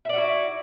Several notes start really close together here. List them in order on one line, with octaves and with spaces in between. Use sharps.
E5 D5 F#4 E4